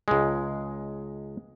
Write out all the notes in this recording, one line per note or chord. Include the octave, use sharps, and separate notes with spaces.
C#2 G#3